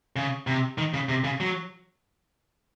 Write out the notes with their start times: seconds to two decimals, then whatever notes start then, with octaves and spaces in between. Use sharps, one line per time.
0.16 C#3
0.47 C3
0.78 D#3
0.94 C#3
1.09 C3
1.24 C#3
1.40 F#3